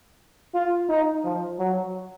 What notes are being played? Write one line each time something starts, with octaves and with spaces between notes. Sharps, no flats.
F4
D#4
F3
F#3